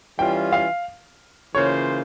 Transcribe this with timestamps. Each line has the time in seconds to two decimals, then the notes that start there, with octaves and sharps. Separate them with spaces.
0.18 E3 G3 C#4 F4 G5
0.52 F5
1.55 C#3 E3 A#3 F4 C5 C#5